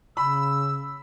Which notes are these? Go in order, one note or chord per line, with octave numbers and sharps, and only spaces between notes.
C#3 B5 E6